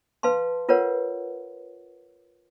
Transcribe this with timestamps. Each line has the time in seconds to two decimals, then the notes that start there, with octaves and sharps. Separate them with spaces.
0.23 B4 F5 A5 C6
0.69 F4 A#4 B4 C#5 F#5